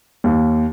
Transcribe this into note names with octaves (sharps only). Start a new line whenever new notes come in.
D#2